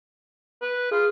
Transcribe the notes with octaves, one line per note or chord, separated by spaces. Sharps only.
B4
F4 G#4